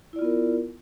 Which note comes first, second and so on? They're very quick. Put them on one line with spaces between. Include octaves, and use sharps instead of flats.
E4 D5 F4 B3 A#4